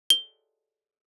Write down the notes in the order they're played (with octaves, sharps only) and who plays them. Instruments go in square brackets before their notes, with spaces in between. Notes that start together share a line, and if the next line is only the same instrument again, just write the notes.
[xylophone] G7